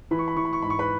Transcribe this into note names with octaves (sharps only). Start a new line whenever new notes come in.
E3 B5
C#6
B5
E3 C#6
B5
C#6
G#2 B5
C#6
B4 B5